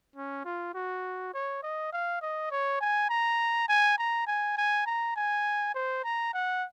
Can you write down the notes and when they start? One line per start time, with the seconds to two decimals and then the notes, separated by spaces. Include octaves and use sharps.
0.16 C#4
0.45 F4
0.74 F#4
1.34 C#5
1.63 D#5
1.93 F5
2.22 D#5
2.51 C#5
2.81 G#5
3.10 A#5
3.69 G#5
3.98 A#5
4.27 G#5
4.57 G#5
4.86 A#5
5.16 G#5
5.75 C5
6.04 A#5
6.33 F#5